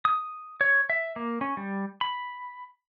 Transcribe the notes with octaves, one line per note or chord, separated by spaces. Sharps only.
D#6
C#5
E5
A#3
C#4
G3
B5